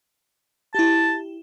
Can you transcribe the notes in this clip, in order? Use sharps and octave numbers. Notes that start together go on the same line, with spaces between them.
E4 G4 A5